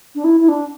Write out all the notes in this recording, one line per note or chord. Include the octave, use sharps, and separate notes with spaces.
D4
E4
E4
D4